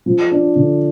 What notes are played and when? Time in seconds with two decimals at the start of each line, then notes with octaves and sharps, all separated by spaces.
0.06 F3
0.31 D4
0.55 D3